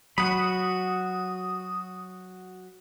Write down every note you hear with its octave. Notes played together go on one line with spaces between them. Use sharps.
F#3 F#4 F#5 B5 D#6